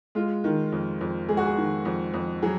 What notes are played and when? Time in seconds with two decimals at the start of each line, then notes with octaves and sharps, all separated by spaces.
0.15 G#3 F4
0.44 D#3
0.72 F2
1.01 F2
1.29 G#3 G#4
1.37 F#4
1.46 G#4
1.57 D#3
1.85 F2
2.14 F2
2.42 F#3 G#4